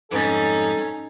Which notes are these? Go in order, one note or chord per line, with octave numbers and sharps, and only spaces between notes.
F2 G#2 G3 C#4 D#4 A4